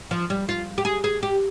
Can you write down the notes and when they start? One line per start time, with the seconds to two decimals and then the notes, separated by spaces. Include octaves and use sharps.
0.11 F3
0.30 G3
0.49 F4
0.78 G4
0.85 G#4
1.04 G#4
1.23 G4